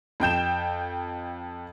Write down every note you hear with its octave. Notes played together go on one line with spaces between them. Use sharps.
F2 G5 G6 E7